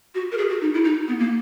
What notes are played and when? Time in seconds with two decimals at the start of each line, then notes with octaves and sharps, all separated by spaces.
0.15 F#4
0.31 A#4
0.38 G#4
0.49 F#4
0.61 D#4
0.73 E4
0.84 D#4
1.08 B3
1.19 A#3